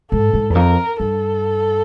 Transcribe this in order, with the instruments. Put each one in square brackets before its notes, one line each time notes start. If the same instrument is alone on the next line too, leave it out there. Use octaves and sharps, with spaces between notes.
[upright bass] G#2 [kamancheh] A4
[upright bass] G#2
E2
[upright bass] F2 [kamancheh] A#4
[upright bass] G2 [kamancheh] A4